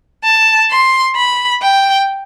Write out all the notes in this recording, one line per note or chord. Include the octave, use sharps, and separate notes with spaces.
A5
C6
B5
G5